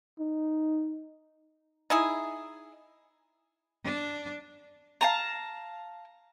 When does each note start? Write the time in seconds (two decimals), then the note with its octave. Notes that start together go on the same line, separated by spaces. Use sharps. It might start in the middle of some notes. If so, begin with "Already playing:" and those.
0.19 D#4
1.90 D#4 E4 G#4
3.84 D4
5.01 F5 A5 A#5